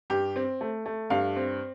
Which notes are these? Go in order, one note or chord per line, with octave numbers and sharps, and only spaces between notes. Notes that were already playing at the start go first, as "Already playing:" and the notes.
G2 G4
C4
A3
A3
G2 F5
C4